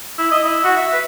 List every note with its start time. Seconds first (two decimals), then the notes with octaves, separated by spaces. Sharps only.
0.18 E4
0.31 D#5
0.44 E4
0.64 F#4
0.77 E5
0.93 B4